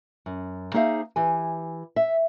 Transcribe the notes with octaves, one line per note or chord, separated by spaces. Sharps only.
F#2
A#3 D#4 G#4 C5 E5 F5
E3 G4 G#5
E5